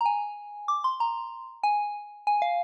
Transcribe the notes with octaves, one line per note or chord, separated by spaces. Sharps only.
A#5
G#5
D6
C6
A#5
G#5
G#5
F5